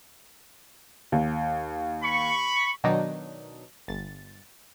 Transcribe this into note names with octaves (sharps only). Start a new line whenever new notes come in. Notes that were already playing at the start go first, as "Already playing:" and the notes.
D#2
B5 C#6
B2 D#3 F#3 D4 D#4
G1 A6